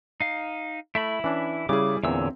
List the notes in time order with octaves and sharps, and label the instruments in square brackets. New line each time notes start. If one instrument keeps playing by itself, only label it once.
[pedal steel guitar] D#4 F5
[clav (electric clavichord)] A3 [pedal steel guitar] E4 E5 B5
[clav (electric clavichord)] E3 D4 [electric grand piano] C#4
[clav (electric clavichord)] C#3 [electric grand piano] G3 E4 G#4 [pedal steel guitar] D6
[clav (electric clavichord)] E2 A#2 [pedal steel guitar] D3 C#5 E6 [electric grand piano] C4 E5